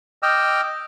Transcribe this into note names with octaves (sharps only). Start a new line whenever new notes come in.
D#5 G5 D6 E6 F6